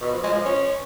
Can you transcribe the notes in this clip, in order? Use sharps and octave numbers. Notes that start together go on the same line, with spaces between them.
B2
F3
G#3
F3
C#4